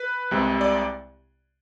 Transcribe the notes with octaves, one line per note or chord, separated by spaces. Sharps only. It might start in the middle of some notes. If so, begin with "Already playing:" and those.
Already playing: B4
C2 C3 G#3
D5